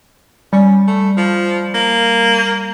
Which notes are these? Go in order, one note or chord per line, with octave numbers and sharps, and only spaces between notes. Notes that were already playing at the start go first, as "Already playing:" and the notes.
G3 C#4
A3
F3
A#3